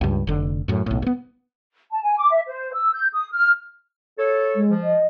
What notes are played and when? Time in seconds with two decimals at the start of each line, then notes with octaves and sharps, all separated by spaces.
0.01 C#2 G2
0.27 F1 D3
0.68 F#2 A2
0.86 B1 A2
1.02 G#2 B3
1.91 A5
2.03 G#5
2.17 D6
2.31 E5
2.47 C5
2.73 E6
2.93 G6
3.12 D#6
3.32 F6
4.19 A4 C#5
4.56 G#3
4.69 F3
4.83 D#5